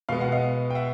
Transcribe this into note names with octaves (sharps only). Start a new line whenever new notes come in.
B2 G#3 B3 F5
F#5
D#5 F5
G5
E5 F#5